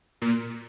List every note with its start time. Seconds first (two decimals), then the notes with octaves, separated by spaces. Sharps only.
0.22 A#2